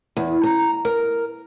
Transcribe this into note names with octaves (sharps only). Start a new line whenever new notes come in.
E2
A#5
A#4